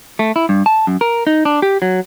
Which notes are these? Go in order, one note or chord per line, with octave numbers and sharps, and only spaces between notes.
A3
E4
G2
A5
F#2
A#4
D#4
D4
G4
F#3